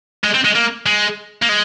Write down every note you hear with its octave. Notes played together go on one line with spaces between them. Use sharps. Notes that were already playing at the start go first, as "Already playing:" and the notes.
G#3
C4
G#3
A#3
G#3
A#3
G#3